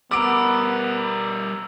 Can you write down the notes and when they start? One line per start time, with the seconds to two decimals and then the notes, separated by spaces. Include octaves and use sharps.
0.11 G3 B3 A#4 D6 E6 D7